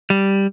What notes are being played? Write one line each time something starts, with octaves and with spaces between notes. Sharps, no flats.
G3